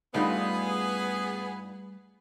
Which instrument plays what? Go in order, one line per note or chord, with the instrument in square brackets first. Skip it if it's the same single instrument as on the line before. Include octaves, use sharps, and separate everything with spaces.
[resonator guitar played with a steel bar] G2 D#4 F4 [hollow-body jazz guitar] G3 A3 D4 [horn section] B3 G#4